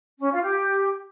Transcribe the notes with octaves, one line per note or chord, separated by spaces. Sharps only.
C#4
F4
G4